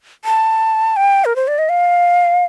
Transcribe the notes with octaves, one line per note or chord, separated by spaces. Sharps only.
A5
G5
A#4
C5
D5
D#5
F5